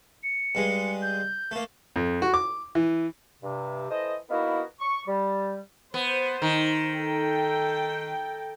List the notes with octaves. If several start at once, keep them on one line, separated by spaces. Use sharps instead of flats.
C#7
G2 G#3
G6
A3 A#3
F2
F#4
D6
E3
G2 C3
E3 A4 C5 D#5
A#3 B3 D#4 E4 F#4 A#4
C#6
G3
B3 C5
D#3
A4 G5